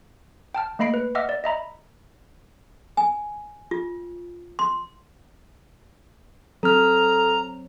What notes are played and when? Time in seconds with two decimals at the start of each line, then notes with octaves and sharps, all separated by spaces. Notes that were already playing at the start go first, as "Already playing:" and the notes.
0.55 G5 A5 F6
0.79 A3 A#3 D#5 B5 C7 D7
0.94 B4
1.15 D#5 E5 F#5 D6 E6 F6
1.29 D5
1.44 D#5 E5 A#5 B5
2.97 G#5
3.71 F4
4.59 C6
6.63 F#3 C4 A4 A#5 F6